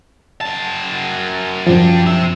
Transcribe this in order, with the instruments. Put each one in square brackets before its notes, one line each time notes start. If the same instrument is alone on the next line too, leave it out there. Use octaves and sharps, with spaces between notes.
[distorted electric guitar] F#2 A5
[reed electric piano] F#2 F3 [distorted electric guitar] G3 D4
[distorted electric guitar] C4 E5